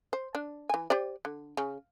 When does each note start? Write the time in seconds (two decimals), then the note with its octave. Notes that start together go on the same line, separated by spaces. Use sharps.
0.13 C5
0.35 D4
0.69 E3 G#5
0.90 G4 C5 D5
1.25 D3
1.57 C#3